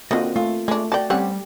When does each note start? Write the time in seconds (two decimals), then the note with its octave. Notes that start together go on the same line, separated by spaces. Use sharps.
0.11 D3 D#3 A#3 C4 F4 F#4 D#5
0.36 A3 F4
0.68 G#3 A3 D4
0.92 F#4 D5 G5 A5
1.10 G3 C4 C#4 G4 F#5